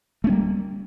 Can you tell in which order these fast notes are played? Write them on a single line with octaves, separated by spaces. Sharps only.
A3 C#4 G3 A#3